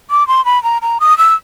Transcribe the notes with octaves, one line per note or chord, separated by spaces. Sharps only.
D6
C6
B5
A#5
A#5
D#6
E6